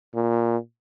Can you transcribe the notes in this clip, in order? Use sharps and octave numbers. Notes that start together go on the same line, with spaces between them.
A#2